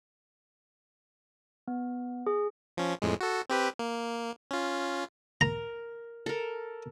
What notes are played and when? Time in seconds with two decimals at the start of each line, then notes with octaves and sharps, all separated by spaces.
1.68 B3
2.27 G#4
2.77 F3 C#4
3.02 F2 A2 G#3
3.21 F#4 A4
3.50 C4 G4 B4
3.79 A#3
4.51 C#4 F4
5.41 A#4 A#5
6.26 A4 A#4